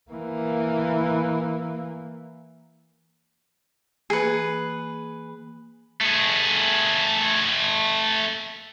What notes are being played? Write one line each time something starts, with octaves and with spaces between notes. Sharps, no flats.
E3 A#3
E3 A#3 G#4 B4
A3 G#4